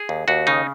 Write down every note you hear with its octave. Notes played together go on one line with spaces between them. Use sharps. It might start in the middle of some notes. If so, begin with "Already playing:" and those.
Already playing: G#4
D#2
D#2 F#4
C#3 D#4